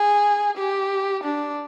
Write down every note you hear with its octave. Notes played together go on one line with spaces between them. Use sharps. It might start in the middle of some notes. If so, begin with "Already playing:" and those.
Already playing: G#4
G4
D4